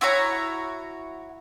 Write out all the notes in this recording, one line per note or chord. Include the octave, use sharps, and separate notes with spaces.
E4 F#4 C#5 A#5